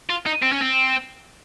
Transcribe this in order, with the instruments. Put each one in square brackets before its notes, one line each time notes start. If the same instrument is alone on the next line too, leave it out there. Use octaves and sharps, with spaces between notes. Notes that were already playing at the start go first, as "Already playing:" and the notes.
[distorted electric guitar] F4
D#4
C4
C#4
C4